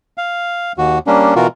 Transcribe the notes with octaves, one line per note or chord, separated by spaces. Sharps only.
F5
D#2 F#4
G3 A#3 C#4 D4
B2 E3 F4 F#4 A#4